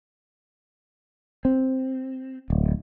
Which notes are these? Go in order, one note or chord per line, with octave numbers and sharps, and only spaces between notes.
C4
D1